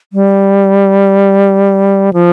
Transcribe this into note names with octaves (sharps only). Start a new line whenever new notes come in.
G3
F3